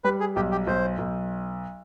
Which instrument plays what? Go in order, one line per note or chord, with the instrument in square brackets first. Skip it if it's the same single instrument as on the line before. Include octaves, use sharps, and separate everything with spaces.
[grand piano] G3 [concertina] B4
[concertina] G#4
[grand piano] B1 [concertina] G4
[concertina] G4
[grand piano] B1 [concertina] C5
[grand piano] B1